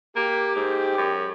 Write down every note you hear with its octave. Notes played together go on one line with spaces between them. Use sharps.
A#3 G4
G#2
F#2